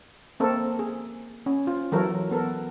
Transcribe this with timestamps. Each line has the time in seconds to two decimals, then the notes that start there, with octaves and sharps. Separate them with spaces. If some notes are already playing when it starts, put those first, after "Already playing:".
0.40 A#3 C4 A4 A#4
0.79 G#4
1.46 C#4
1.67 F4
1.92 E3 F#3 A4 A#4 C#5
2.31 B3 A4 A#4